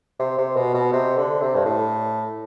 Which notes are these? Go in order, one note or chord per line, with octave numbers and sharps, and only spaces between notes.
C3
C3
B2
B2
C3
D3
C3
G2
A2